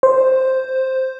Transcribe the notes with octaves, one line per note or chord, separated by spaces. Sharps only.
C5